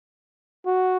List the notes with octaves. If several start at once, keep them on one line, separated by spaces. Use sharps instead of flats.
F#4